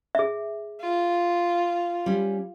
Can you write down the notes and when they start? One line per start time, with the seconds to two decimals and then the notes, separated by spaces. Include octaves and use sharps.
0.15 G#4 E5
0.81 F4
2.06 G3 C#4